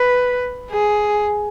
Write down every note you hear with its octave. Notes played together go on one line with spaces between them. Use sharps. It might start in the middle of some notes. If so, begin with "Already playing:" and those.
Already playing: B4
G#4